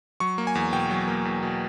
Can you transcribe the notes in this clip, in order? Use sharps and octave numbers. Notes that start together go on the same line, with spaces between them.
F#3 C#6
A#3
G#5
E2
B2 G5
F#3
A#3
E2
B2